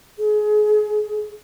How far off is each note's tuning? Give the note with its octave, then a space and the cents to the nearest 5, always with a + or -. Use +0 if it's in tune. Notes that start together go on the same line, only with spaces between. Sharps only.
G#4 +25